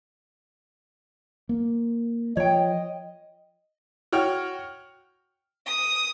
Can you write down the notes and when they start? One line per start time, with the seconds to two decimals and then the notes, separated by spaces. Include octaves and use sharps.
1.49 A#3
2.37 F3 C#5 D#5 G5
4.12 F#4 C#5 G5 F6
5.67 D#6